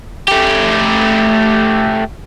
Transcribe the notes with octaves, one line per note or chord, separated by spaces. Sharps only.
A3 G4